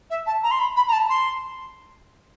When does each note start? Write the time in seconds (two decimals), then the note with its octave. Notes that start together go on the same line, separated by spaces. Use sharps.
0.10 E5
0.26 A5
0.43 A#5
0.51 C6
0.60 B5
0.76 B5
0.88 A#5
0.92 A5
1.09 C6